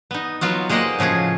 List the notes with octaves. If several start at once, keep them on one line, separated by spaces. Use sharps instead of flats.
B3 D#4
F#3 B3 F4 F#4
G#3 A#3 G4 C5 D#5 F#5
A2 C#3 F3 F#4 G#4